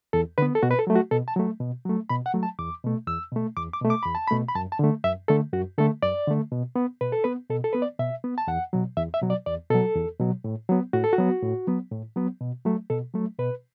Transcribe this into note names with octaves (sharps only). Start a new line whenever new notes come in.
E2 A4
D3 B3 B4
A4
B2 F#4
B4
A4
F#3 A3
F#4
B2 A4
A5
F#3 A3
B2
F#3 A3
B2 B5
F#5
F#3 A3
A5
E2 D6
B2 A3
E2 E6
B2 A3
E2 D6
D6
B2 A3
D6
E2 B5
A5
B2 A3 B5
B5
F#2 A5
A5
D3 A3
F#2 E5
D3 A3 A4
F#2 F#4
D3 A3 A4
F#2 D5
D3 A3
B2
B3
B2 B4
A4
B3 B4
B2 A4
A4
B3 B4
D5
B2 E5
B3
A5
E2 F#5
B2 F#3
E2 E5
E5
B2 F#3
D5
E2 D5
B2 F#3 A4
E2
B2 F#3
A2
F#3 B3
A2 F#4
A4
F#4
F#3 B3
A2
F#3 B3
A2
F#3 B3
B2
F#3 A3
B2 A4
F#3 A3
B2 B4